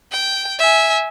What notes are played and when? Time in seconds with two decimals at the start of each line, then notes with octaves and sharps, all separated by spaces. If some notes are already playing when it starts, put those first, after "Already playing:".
0.12 G5
0.59 E5 G#5